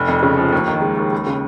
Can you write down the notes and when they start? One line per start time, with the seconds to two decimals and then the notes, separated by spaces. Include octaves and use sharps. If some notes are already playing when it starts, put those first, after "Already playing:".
Already playing: F1
0.08 F2
0.23 C#3
0.38 F3
0.53 D#2
0.68 D#3
0.82 G#3
0.98 D#2
1.12 C#2
1.27 C#3